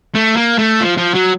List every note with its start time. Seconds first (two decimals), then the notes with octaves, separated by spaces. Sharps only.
0.15 A3
0.37 A#3
0.59 A3
0.81 F3
0.98 F3
1.15 F#3